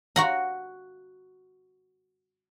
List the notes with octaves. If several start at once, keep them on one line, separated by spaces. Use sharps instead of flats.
F#4 F#5 A#5